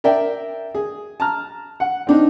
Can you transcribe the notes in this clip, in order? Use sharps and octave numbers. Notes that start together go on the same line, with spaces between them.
A#4 D5 E5 G5
G#4
A5 A#5 F6
F#5
C4 D4 D#4